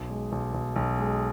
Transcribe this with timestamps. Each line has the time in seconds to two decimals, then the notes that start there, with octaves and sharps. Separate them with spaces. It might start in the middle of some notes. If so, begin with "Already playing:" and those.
Already playing: B1
0.10 G#3
0.32 B1
0.54 B1
0.76 B1
0.98 G#3